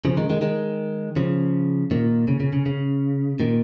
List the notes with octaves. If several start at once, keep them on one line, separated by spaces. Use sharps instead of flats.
C#3 F3
D#3 G#3
D#3 G#3
D#3 G#3
C#3 F3
A#2 D#3
C#3
C#3
C#3
C#3
A#2 D#3